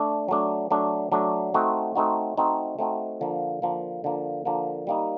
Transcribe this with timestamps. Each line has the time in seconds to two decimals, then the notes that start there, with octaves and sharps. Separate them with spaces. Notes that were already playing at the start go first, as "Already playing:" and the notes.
Already playing: A3 D4
0.28 F#3 A3 D4
0.71 F#3 A3 D4
1.12 F#3 A3 D4
1.54 A3 C4 D#4 F#4
1.95 A3 C4 D#4 F#4
2.37 A3 C4 D#4 F#4
2.79 A3 C4 D#4 F#4
3.21 D3 F3 A#3
3.62 D3 F3 A#3
4.04 D3 F3 A#3
4.45 D3 F3 A#3
4.87 G3 A#3 D#4